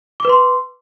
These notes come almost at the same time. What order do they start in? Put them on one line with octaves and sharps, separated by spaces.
D6 B4 C6